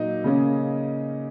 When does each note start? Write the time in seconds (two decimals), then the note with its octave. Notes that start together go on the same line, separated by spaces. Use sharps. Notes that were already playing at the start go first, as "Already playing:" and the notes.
Already playing: A#2 F#3 A#3 D#4 D#5
0.24 C#3 A#3 C#4